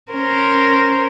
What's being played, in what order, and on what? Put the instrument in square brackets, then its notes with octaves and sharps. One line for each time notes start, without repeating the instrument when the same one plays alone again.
[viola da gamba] C#4 A#4 C5